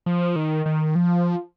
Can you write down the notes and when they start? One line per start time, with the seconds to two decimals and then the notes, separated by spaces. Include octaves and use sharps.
0.06 F3
0.36 D#3
0.66 D#3
0.95 F3